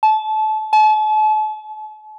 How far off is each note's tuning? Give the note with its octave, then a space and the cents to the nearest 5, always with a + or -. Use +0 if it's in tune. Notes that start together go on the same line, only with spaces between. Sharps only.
A5 -25
A5 -40